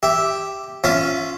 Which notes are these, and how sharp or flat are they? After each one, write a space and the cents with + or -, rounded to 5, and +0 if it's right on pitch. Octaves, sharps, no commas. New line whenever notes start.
G4 +0 E5 +0
C#4 +0 F4 +0 E5 +15